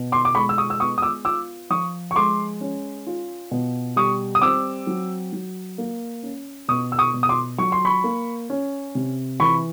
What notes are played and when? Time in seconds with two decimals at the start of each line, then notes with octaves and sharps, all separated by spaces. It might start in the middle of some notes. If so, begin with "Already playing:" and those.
Already playing: B2
0.12 C6 D6
0.25 D6
0.35 G#3 B5 C#6
0.49 E6
0.58 C#6 D#6
0.70 E6
0.80 B3 C#6 D#6
0.98 D#6
1.02 D6 E6
1.25 F4 D6 E6
1.70 F3 C#6 D#6
2.11 C#6
2.16 G#3 C6 D6
2.61 C#4
3.07 F4
3.51 B2
3.96 G3 C#6 D#6
4.35 D#6
4.42 C4 D6 E6
4.87 F#3
5.33 F#3
5.78 A#3
6.23 C#4
6.68 B2 C#6 D#6
6.92 E6
6.99 C#6 D#6
7.14 B2
7.23 D#6
7.29 C6 D6
7.58 F#3 C#6
7.72 C6
7.85 B5 C#6
8.04 A#3
8.50 C#4
8.95 C3
9.40 E3 B5 C#6